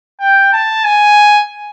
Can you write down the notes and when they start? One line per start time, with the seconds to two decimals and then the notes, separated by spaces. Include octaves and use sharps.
0.20 G5
0.53 A5
0.85 G#5